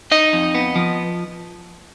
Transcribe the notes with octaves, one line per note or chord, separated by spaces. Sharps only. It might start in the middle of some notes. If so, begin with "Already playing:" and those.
D#4 D#5
F2
B3
F3